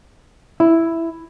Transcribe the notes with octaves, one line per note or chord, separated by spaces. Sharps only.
E4